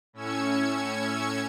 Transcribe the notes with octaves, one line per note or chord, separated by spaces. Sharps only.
A2 C#4 E6 G#6 C#7